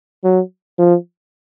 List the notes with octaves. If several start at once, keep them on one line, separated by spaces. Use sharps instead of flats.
F#3
F3